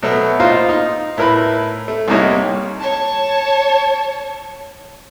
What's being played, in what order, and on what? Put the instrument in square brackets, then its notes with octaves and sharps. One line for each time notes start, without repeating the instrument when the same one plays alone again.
[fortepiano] B2 F#3 A3 B3
A#3 D#4 F4 C5 F5
D#4
A2 E4 A#4 B4 B5
A3
C2 C3 G3 A#3 D#4 C#5
[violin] C#5 A5